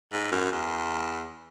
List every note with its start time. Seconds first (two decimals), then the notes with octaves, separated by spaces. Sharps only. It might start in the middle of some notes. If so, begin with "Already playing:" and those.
0.12 G#2
0.32 F#2
0.52 E2